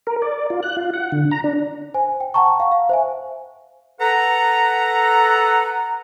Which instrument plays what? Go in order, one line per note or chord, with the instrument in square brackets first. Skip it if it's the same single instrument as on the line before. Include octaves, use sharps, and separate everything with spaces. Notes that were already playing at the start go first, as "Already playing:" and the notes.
[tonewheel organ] A#4
D5
F4
F#6
F4
F#5
D3
A#5
D4
[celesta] C5 G#5
G5
F#5 G5 A5 A#5 C#6
F5 F#5 C#6
F5
C5 E5 G#5
[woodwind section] A4 B4 F#5 A#5